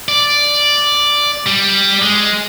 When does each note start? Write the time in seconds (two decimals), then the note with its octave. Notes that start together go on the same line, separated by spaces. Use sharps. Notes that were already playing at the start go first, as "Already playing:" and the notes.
0.08 D5
1.46 G3
2.02 G#3